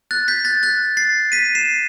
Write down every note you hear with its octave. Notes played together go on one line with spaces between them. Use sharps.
F#6 A6
G6 B6
F#6 A6
F#6 A6
A6 C7
B6 D#7
C7 E7